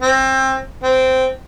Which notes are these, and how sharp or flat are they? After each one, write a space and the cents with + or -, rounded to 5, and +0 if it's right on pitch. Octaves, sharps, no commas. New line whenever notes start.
C4 +25
C4 -10